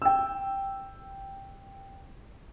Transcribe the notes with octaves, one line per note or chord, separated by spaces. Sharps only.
G5 E6